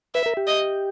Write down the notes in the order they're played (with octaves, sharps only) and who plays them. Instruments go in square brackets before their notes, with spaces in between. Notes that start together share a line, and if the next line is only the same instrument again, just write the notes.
[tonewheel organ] B4 [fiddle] E5
[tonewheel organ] A#4
G4
[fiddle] D#5